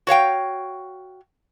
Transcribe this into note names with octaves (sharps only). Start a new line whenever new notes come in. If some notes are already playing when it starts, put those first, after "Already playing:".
F#4 C#5 F5 G5